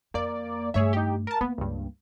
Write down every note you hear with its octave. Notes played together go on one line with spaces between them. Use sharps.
F2 A#3 D5
G2 A3 G#4 C#5 E5
D#4 G4
A#4 A5
A#3 B3
C#2 G2